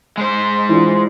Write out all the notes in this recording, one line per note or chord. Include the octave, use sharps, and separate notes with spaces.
G#3 C5
E3 D4 F4